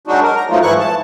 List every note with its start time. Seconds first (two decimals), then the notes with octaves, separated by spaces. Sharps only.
0.07 F#3 G#3 D4 D#4 F#4
0.23 A#4
0.36 A#5
0.50 F3 F#3 A3 A#3 D#4 F4
0.63 G#2 E3 F3 E4 C#6 F#6
0.80 A5